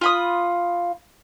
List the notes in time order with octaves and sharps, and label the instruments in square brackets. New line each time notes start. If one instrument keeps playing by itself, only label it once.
[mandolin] F4 B5 D#6